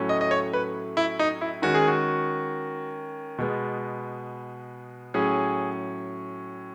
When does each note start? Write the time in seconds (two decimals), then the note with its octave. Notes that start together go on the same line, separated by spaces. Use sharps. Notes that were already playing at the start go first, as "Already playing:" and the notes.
Already playing: A2 F#3 A3 C#4
0.09 D#5
0.21 D#5
0.31 C#5
0.53 B4
0.97 E4
1.19 D#4
1.41 E4
1.62 D#3 G#3 C#4 F#4
1.75 G#4
1.88 F#4
3.38 B2 G#3 B3
5.14 A2 F#3 C#4 G#4